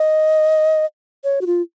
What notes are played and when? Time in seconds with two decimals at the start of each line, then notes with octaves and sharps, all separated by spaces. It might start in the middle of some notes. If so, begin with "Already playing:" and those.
Already playing: D#5
1.24 C#5
1.41 F#4
1.46 F4